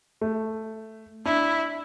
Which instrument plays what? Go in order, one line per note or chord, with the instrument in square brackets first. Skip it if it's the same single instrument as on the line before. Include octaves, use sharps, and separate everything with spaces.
[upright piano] A3
[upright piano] D4 [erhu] E4